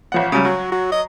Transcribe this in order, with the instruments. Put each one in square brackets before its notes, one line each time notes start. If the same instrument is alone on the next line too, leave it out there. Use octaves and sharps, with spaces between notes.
[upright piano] A1 F3 F#5
C#3 F#3 G3
[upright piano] F#3 [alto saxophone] F#4
[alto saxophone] F#4
D#5